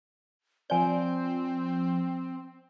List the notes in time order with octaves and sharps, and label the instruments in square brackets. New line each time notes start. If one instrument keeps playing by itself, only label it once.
[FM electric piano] F3 G6 [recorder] C4 [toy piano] D5 G#5